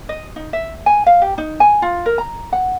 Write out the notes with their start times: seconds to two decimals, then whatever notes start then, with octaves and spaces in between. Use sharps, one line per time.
0.09 D#5
0.36 D#4
0.53 E5
0.86 G#5
1.07 F5
1.22 G4
1.38 D#4
1.60 G#5
1.82 F4
2.06 A#4
2.18 A#5
2.53 F#5